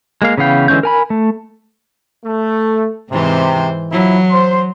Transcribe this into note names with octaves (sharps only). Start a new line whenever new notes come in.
G#3 A#3 F5
C#3 E3 B3 F5 G5
D3 E3 G#3 C#4 G6
A#4 G#5 B5
A3
A3
G#2 C3 E3 C5
F3 F#3 E4
C5 C6